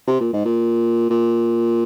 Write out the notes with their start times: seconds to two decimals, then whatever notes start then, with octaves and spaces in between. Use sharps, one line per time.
0.07 C3
0.20 A#2
0.33 G#2
0.45 A#2
1.10 A#2